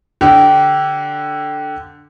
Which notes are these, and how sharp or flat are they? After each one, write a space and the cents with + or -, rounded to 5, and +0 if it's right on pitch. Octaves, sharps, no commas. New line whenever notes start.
D3 +0 D4 +0 G4 -20